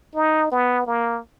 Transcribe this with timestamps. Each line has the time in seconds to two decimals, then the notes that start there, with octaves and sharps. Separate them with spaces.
0.15 D#4
0.52 B3
0.87 A#3